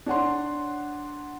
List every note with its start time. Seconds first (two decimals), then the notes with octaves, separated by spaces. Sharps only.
0.06 D4 C#5 F#5 C6